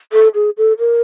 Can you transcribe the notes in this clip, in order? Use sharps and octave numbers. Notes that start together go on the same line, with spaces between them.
A4
G#4
A4
A#4